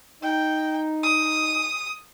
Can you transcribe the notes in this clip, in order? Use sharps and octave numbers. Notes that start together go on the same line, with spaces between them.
D#4 G5
D#6